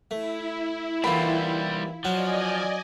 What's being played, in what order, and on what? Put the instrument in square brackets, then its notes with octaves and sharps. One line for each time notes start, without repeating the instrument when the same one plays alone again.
[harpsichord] A3 [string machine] E4
[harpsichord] D#2 D3 E3 [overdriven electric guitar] G3 C4 [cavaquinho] F4 B5
[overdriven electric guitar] F3 [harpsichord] F#3 C#4 F#4 [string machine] D5 D#5 G#5